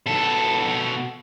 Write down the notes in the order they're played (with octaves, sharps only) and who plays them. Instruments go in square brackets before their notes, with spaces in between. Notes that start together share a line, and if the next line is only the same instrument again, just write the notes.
[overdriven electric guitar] B2 A4